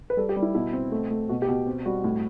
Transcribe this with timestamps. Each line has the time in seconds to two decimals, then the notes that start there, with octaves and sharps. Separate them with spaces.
0.10 B4
0.17 G3 A4
0.29 G4
0.36 G3
0.42 E4
0.55 B2 E4
0.73 C4
0.92 A3
1.10 A3
1.29 B2 F#4
1.42 G4
1.48 B2
1.66 C4
1.85 G3 F#4
2.04 A2